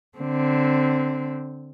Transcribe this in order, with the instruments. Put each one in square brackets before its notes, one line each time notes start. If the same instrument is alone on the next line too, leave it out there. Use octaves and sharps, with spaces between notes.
[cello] D3 C4